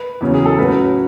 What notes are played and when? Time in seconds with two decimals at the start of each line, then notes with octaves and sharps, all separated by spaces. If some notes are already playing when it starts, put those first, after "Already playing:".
Already playing: B4
0.21 E2 C#3 F#3 C#4
0.34 G#4
0.46 A4
0.58 A2 F#3 A3 C#4 F#4 B4